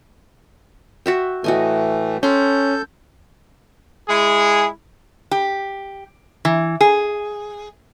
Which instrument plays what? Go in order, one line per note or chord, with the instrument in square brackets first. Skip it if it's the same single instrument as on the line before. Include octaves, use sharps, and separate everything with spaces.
[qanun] F#4 E5 G5
[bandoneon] A2 E3 A3 [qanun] F#4 D#5 G#5
[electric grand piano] C#4 [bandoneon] A4 G6 [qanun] G5 C6
[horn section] G#3 E4 G#4
[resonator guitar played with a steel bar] G4
E3
G#4